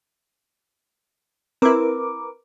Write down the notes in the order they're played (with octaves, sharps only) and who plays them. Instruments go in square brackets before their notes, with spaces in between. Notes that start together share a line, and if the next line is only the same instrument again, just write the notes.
[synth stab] C4 E4 [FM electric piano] A#4 B4 D6